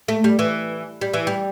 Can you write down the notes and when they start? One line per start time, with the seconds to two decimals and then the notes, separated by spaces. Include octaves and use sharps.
0.08 A3
0.24 G3
0.39 E3
1.01 G3
1.14 E3
1.27 G3